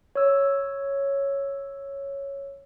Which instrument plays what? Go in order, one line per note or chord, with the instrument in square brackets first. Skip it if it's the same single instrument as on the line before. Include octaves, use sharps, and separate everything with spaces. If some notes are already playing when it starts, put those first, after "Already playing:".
[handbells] C#5 E6